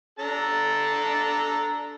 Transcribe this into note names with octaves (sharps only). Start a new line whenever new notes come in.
D4 A4 A#5